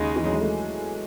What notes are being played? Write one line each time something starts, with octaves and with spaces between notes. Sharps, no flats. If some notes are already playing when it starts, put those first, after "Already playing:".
Already playing: D#2 C#3 G#3 D#4
E3
F#3
G#3
A3